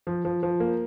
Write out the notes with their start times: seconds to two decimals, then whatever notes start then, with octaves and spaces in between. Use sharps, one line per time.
0.07 F3
0.25 F3
0.43 F3
0.60 A#3